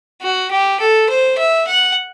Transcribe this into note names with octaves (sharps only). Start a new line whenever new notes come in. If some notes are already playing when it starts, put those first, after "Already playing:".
F#4
G4
A4
C5
E5
F#5